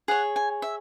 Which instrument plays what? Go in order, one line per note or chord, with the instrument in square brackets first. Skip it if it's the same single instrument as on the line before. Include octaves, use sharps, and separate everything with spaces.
[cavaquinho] G#4 C#5 F#5
G#5
E5